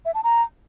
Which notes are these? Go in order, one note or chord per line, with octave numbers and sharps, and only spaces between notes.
E5
A5
A#5